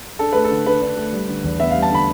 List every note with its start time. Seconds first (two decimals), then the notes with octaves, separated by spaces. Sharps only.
0.19 D4 A4
0.32 A3 B4
0.45 A4
0.50 D3
0.66 D3 B4
0.81 D4
0.97 A3
1.13 G3
1.28 D3
1.44 E2
1.60 B3 E5
1.71 F5
1.75 G3
1.82 A5
1.90 D3 B5